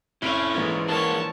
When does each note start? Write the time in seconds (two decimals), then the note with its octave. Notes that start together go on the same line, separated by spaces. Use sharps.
0.22 F1 C#4 E4 A4 E5 D7 F7
0.54 A#1 G#2 E3 G#3
0.88 D4 A#4 C#5 A5